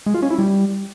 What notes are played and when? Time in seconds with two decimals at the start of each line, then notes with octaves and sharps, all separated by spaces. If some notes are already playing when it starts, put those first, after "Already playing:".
0.06 G#3
0.14 F4
0.22 C#4
0.30 E4
0.38 G3